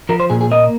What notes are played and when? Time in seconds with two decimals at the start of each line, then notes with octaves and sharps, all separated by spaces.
0.09 F3 A#4
0.20 C5
0.30 A#2 G#4
0.41 G#4
0.51 A#3 D#5